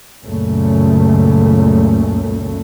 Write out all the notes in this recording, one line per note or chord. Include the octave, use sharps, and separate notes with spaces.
C#2 F#2 A#2 C#3 A3